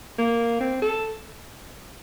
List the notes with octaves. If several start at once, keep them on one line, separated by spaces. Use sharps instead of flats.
A#3
C4
A4